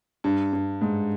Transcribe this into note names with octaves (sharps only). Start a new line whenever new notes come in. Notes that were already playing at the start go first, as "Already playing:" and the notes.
G2
G2
G#2